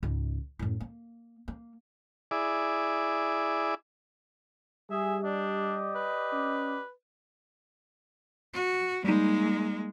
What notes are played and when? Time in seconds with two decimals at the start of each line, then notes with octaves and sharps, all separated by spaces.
0.03 C#2 G#2
0.59 F#2 A2
0.81 A#3
1.48 A#3
2.31 E4 G#4 D5
4.90 G3 G#4 E5
5.24 D4 G4 D5 D#5
5.95 B4
6.33 C#4
8.53 F#4
9.04 G3 G#3 A#3 D#4